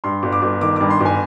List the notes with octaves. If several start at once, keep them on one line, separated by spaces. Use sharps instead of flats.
G2 C6
G1
D6
G1
D#3 D6
G2 D6
C6
G1 G#5